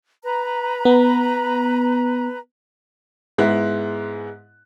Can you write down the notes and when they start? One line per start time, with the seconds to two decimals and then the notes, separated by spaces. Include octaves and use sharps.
0.23 B4 A#5
0.85 B3
3.38 G#2 G#3 B3 E4 F#6